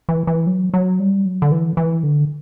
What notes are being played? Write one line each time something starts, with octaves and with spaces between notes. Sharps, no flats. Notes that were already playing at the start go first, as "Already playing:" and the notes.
E3
E3
F#3
F#3
G3
F#3
D3
E3
E3
D3